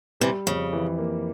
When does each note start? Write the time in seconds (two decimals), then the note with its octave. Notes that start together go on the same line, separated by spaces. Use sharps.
0.20 C3 E3 G3
0.47 F2 C#3
0.73 E3
0.98 A#3